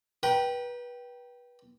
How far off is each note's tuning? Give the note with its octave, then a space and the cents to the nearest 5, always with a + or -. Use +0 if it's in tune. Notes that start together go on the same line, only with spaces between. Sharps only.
B4 -25 G5 -10 A#5 +30